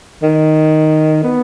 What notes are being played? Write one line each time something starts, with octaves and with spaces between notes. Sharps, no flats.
D#3
B3